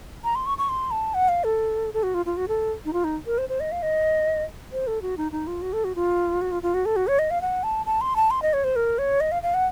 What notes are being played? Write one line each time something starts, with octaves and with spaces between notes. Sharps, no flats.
A#5
C6
C#6
C#6
C6
A5
F#5
F5
A4
A4
F#4
F4
F4
F#4
A4
D#4
F4
D#4
A#4
C5
C5
D#5
F5
D#5
C5
A4
F#4
D#4
D#4
F4
F#4
A4
F#4
F4
F#4
F4
F4
F#4
A4
F#4
C#5
D#5
F5
F#5
A5
A5
C6
A5
C6
D#5
C#5
C5
A#4
C#5
D#5
F5
F5
F#5